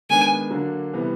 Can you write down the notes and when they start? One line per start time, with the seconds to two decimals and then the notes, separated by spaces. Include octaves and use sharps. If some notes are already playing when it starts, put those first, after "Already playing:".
0.10 D#3 G#3 B3 D4 G#5
0.50 D3 F#3 A#3 D4
0.93 C3 E3 G3 B3